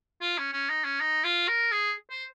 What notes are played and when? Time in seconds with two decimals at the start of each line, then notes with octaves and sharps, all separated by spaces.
0.22 F4
0.38 C#4
0.53 C#4
0.69 D#4
0.84 C#4
1.00 D#4
1.24 F4
1.48 A#4
1.72 G#4
2.10 C5